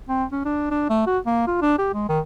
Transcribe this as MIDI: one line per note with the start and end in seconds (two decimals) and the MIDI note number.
0.09 0.24 60
0.32 0.42 61
0.45 0.68 62
0.71 0.88 62
0.90 1.03 57
1.07 1.19 66
1.26 1.47 58
1.47 1.59 65
1.61 1.76 62
1.78 1.91 67
1.94 2.07 56
2.09 2.20 51